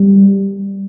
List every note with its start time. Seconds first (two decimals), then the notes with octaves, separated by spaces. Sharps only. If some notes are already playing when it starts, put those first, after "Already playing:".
Already playing: G3